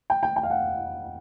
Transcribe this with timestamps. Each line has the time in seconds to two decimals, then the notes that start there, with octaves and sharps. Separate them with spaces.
0.10 G5
0.23 G5
0.36 G5
0.43 F5
0.50 F#5